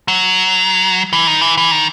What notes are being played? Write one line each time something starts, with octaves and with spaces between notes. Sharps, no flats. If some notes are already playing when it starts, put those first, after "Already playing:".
F#3
E3
D#3
E3
E3
D#3